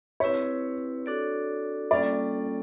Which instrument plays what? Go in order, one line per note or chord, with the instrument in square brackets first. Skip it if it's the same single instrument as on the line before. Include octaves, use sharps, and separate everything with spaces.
[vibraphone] C4 E4 G4 B4 [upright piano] C#5
[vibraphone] D4 F#4 A4 D5
[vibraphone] G3 A#3 C#4 F4 A4 [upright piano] D5